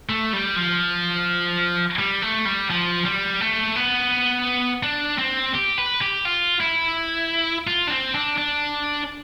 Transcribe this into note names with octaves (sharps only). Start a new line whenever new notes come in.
A3
G3
F3
G3
A3
G3
F3
G3
A3
B3
D4
C4
G4
B4
G4
F4
E4
F4
D4
C4
D4
D4